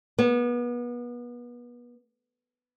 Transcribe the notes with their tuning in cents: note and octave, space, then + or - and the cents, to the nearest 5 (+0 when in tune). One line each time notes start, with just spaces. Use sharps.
B3 -30